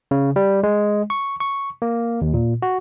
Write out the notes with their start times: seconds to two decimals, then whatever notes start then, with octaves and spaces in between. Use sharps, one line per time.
0.11 C#3
0.36 G3
0.63 G#3
1.10 C#6
1.40 C#6
1.82 A#3
2.21 D#2
2.34 A#2
2.62 F#4